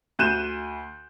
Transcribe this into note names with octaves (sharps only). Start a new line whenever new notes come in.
D2 F#6 G6 D#7 E7